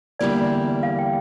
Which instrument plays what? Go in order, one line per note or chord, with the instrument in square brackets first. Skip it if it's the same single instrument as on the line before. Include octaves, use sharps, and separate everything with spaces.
[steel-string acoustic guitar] E2 D3 G3 A#3 E4 [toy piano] D5
[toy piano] F5
G5